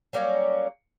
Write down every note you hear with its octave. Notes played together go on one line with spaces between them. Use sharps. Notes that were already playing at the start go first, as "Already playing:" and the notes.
F#3 G3 A#3 C#4